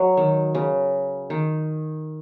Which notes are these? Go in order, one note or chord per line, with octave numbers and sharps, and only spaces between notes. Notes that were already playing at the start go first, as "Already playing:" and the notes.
Already playing: F#3
D#3
C#3
D#3